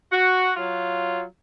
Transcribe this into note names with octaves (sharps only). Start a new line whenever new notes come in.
F#4
F#3 F4